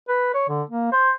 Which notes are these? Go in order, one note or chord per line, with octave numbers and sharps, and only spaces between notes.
B4
C#5
D3
A#3
C5